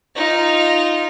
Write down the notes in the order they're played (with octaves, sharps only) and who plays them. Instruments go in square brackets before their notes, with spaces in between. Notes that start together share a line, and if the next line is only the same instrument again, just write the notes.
[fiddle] D#4 F4